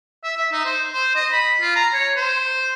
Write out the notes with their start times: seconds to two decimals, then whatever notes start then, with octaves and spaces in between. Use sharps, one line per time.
0.24 E5
0.37 E5
0.52 D#4
0.65 C5
0.93 C5
1.15 D#5
1.32 B5
1.61 F4
1.76 A#5
1.94 C#5
2.16 C5